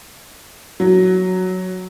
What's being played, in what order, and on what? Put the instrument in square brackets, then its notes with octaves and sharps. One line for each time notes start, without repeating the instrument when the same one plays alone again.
[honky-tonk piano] F#3